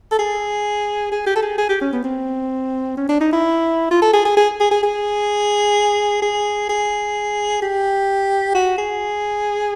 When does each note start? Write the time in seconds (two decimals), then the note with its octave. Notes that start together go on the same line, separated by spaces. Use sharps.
0.11 A4
0.19 G#4
1.11 G#4
1.26 G4
1.36 A4
1.42 G#4
1.58 G#4
1.69 G4
1.81 C#4
1.93 B3
2.04 C4
2.97 C#4
3.09 D4
3.21 D#4
3.33 E4
3.91 F4
4.02 A4
4.13 G#4
4.25 G#4
4.37 G#4
4.60 G#4
4.71 G#4
4.83 G#4
6.22 G#4
6.69 G#4
7.62 G4
8.55 F#4
8.78 G#4